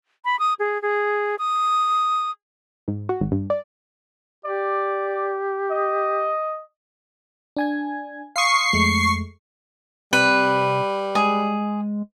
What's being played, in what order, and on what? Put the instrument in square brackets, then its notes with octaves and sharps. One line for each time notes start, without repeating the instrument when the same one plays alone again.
[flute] B5
D#6
G#4
G#4
D#6
[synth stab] G#2
F#4
G#1
G2
D5
[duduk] G4 [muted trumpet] D5
[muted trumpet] D#5
[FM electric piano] D4 G#5 G#6
[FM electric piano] F5 C6 D#6 [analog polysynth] C#6 C7
[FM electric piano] F2 G#3 A3
[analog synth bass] C3 [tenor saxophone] G3 [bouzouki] B4
[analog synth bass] G#3 [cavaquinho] G#4